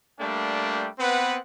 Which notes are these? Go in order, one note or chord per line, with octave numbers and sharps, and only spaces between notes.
G3 A3 A#3 D4 G5
B3 C4 B4 F#5